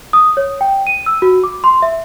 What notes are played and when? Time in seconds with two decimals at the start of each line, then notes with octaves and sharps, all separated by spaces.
0.13 D#6
0.37 C#5
0.61 G5
0.87 D#7
1.06 E6
1.22 F#4
1.44 D6
1.64 C6
1.82 E5